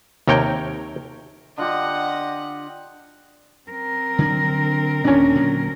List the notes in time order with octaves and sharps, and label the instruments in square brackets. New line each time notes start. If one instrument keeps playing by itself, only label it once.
[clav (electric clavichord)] D#2 C3 A#4 C#5 G5
[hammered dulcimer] D3 F4 G4 [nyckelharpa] D#5 F#5
[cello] C4 A#4
[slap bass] D3 F#3 D4
[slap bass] D#2 A#2 [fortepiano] C#4 D4
[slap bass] A#2 D3 F#3